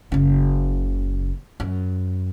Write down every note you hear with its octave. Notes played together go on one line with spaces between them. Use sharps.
F#1 C#3
F#2